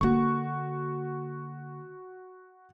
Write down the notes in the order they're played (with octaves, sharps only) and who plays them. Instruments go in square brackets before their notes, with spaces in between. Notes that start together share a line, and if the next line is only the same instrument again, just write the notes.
[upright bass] D3 A#3 [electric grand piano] F#4 C#6